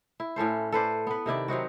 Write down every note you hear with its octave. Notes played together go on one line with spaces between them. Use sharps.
E4
A2 C#4 A4 C5
A4 B4 C5 D5
B3 B4
C3 D#3 E4 D5
F#3 C4 D#4 F#4